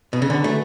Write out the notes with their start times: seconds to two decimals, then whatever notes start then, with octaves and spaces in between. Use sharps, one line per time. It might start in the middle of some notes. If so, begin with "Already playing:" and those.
0.13 B2
0.22 C#3
0.30 D3 F#3 C#4 F#4 B4
0.44 A3